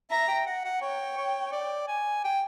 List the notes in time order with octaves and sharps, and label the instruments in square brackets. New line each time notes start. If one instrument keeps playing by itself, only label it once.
[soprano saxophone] E5 [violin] A#5
[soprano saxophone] G5
F#5
F#5
[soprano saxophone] C#5 [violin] G5
[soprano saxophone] C#5
D5
G#5
G5